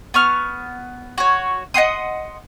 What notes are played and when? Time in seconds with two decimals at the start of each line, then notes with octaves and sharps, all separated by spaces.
0.14 B3 C#6 F6
1.18 F#4 C#5
1.74 D#5 F#5 C6 D#6